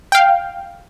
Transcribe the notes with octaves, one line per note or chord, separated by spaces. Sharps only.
F5 G5